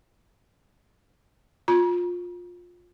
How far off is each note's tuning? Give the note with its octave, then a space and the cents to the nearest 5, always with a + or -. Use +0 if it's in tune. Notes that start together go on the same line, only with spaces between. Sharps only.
F4 +20 A#5 +45